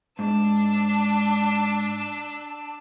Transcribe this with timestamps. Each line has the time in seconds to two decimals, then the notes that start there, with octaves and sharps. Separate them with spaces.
0.19 G#2 D4 E6